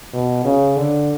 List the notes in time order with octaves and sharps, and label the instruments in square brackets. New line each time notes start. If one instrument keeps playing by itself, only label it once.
[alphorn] B2
C#3
D3